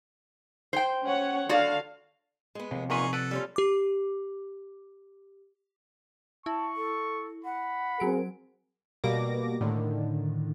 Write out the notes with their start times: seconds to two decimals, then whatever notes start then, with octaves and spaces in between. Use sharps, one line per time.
0.73 C5 G5
1.04 C#4 C#5 F#5
1.49 D3 F#4 D5 F5
2.55 G#3 B3
2.71 D#2 C3 F3
2.90 E2 A#2 D#4 F4 G#4 A#4 B4 C#6
3.13 A4 B4 D5 F#5
3.31 G3 C#4 F4
3.56 G4 D6
6.46 E4 A5 C#6
6.76 A4
7.45 F#5 B5
8.00 F#3 C4 G#4 A#4 D7
9.04 B2 G3 A#3 D6 A#6
9.61 A2 D3 D#3